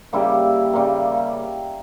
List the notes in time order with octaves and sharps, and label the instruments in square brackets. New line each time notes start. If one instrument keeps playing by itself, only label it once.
[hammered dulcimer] C#3 G3 A#3 E4 G4
C#3 G3 A#3